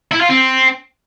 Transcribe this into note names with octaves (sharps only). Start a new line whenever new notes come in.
E4
F4
C4